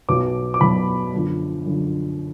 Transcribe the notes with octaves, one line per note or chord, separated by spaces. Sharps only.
B1 B2 F#3 B3 D6
D6
B1 B2 F#3 B3 B5
F#2 D3 F3
F#2 D3 F3